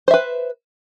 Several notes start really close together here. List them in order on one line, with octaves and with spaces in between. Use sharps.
C5 E5 B4